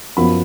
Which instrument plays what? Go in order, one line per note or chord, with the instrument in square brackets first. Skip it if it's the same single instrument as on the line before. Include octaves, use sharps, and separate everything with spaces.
[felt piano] F#2 F3 B3 F4 B5